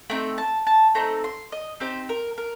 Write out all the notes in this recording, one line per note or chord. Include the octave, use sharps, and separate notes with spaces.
A3 C4 D#4 G5
A5
A5
A3 C4 D#4 A#5
C6
D#5
C4 D#4 G4 C5
A#4
A#4